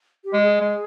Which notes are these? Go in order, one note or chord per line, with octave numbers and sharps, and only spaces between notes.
G4
G#3
G#4
G#3